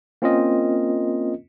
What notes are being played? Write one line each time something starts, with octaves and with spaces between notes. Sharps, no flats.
A#3 C4 C#4 F4 A#4 D#5